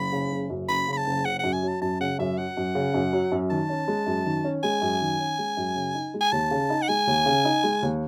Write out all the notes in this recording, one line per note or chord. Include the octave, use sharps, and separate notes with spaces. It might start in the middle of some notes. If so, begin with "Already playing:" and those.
Already playing: F#1 B5
C#3
F#1
F#2
F#1 B5
C#3 B5
A5
F#1
C#3 F#5
F#2 F#5
G#5
F#3 A5
F#2 A5
C#3 F#5
F#2 E5
F#3 F#5
F#2
C#3
F#2
F#3
F#2
D#3 A5
C#4
G#3
F#2
D#3
C#4
G#3 G#5
F#2
D#3
C#4
G#3
F#2
C#3
D#4
G#3
G#5
D#2 A5
C#3
D#4
F#5
G#3 G#5
D#2
C#3
D#4
G#3
D#2